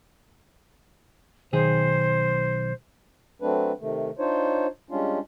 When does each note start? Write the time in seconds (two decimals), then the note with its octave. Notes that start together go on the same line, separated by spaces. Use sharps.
1.53 B1 D#3 G#4 C5
3.42 F#3 A3 C4 D4 B4
3.80 C3 D#3 A3
4.19 D4 D#4 F4 C5 C#5
4.90 G3 G#3 C#4 D4 F4